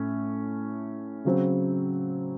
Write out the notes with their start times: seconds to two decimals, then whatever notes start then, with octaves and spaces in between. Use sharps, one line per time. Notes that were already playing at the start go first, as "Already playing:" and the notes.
Already playing: A2 A3 C#4
1.25 C#3 F#3 C4